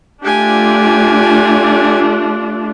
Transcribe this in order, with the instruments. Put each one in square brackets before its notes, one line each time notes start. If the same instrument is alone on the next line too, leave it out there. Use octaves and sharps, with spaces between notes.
[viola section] A3 D4 F4 [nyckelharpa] G4 G#5